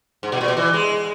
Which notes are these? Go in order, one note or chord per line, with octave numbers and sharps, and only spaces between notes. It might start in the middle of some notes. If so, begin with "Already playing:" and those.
G#2
B2
A#2
B2
E3
G#3